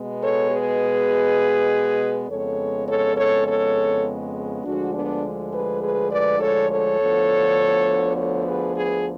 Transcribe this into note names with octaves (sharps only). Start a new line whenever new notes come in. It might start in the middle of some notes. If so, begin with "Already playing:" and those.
Already playing: B2 G#3 B3
A4 C#5
G#4 B4
F2 C#3 G#3 B3 A4 C#5
A4 C#5
A4 C#5
A4 C#5
D2 D3 F3 G#3 D4 F#4
B3 D4
G#4 B4
G#4 B4
B4 D5
A4 C#5
A4 C#5
D2 D3 F3 B3
A4 C#5
G#4 B4
G#4 B4